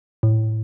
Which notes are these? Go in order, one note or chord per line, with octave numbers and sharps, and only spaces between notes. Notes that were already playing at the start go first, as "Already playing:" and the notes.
A2